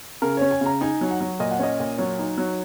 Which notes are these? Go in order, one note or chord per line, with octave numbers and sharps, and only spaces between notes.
C#3 A#4
C#4 C#5
G#5
C#3 A#5
D#4 G#5
F#3
F#5
F#3
A#2 D#5
F#5
C#4 D#5
A#2
F#3 C#5
D#4
F#3